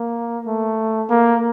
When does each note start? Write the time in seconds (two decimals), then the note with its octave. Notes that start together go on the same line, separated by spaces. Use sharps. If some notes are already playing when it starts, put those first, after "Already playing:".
Already playing: A#3
0.47 A3
1.10 A#3